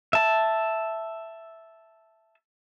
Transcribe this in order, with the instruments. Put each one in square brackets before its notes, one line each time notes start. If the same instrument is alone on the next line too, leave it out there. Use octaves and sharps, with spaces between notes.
[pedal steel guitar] E5 A5